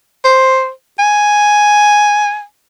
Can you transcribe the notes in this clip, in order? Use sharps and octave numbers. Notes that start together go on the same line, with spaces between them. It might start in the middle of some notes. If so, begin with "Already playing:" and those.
C5
G#5